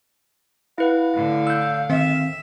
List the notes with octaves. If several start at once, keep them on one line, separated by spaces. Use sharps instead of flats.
E4 B4 F5 F#5
A2 D3 E4
E6 F#6 G6
D#3 C4 E5